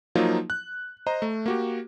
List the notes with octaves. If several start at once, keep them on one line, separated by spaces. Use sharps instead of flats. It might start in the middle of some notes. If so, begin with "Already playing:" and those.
F3 F#3 A#3 D#4 F4
F#6
C5 D#5 A#5
A3
A#3 F#4 G4